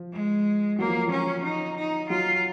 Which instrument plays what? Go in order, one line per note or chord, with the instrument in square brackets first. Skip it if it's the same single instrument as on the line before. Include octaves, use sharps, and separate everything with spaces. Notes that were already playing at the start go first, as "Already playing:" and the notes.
Already playing: [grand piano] F3
[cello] G#3
[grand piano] F#3 [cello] A#3
[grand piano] F3
[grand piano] F3 [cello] C#4
[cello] D#4
D#4
[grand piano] F#3 [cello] F4